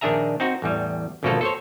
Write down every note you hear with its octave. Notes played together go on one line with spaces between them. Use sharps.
A#1 D#3 D4 G#4 E5 A#5
C4 D#4 F#4
A1 E2 G3
G#1 D2 B2 F3 A#3 A4
A4 C5 C#5